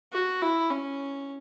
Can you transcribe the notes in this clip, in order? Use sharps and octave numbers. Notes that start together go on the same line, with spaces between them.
F#4
E4
C#4